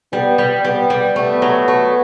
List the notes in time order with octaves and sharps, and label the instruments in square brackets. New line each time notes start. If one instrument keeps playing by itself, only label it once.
[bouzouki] G3 [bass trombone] B3
[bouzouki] G3
[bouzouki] G3 [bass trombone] B3
[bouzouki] G3
[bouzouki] A3 [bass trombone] B3
[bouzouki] F#3
A3